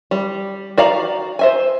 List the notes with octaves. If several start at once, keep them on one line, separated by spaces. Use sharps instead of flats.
G3
F#4 D5 F5 A#5
C5 E5 G#5